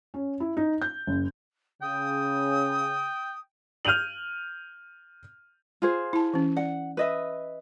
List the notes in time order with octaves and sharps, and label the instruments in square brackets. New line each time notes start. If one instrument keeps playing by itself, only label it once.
[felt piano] C#4
E4
D#4
G6
F#1
[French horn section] C#3 [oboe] G5 [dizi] D#6
[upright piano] F6 G6 D#7 F7 F#7
[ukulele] F4 G#4 C5
[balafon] E4 A5
E3 C#4
[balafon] D5 [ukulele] F#5
[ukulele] B4 D#5 E5